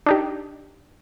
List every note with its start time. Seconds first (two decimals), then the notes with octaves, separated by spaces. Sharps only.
0.06 D4 D#4 G4